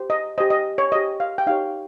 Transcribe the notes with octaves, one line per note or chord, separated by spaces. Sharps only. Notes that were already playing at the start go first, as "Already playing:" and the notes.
Already playing: G4 C5
D#5
G4 C5 D#5
D#5
C#5
G4 C5 D#5
F5
G5
D#4 G4 C#5 F5